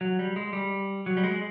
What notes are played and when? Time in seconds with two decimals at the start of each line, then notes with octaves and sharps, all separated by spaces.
0.01 F#3
0.19 G3
0.36 G#3
0.53 G3
1.06 F#3
1.17 G3
1.24 G#3